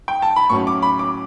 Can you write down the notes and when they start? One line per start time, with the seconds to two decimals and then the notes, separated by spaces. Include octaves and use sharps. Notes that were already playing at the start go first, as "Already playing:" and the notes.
0.08 G5
0.22 A5
0.36 B5
0.49 A2 F#3 C#4 C#6
0.67 D6
0.83 B5
0.99 D6